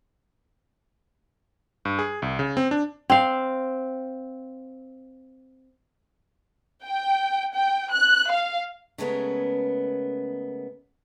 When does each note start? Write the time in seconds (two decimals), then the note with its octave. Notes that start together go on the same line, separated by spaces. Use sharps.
1.85 G2
1.99 G#4
2.22 C2
2.39 C#3
2.57 C4
2.71 D4
3.10 C4 F5
6.83 G5
7.53 G5
7.93 F#6
8.30 F5
8.98 C#3 G#3 A3 B3 C#4 A#4